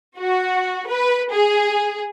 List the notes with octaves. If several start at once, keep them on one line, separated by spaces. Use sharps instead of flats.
F#4
B4
G#4